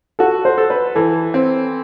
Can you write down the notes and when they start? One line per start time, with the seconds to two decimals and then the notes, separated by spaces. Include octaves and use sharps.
0.19 F#4 A4
0.45 C5
0.58 A4
0.70 B4
0.95 E3 A4
1.34 C4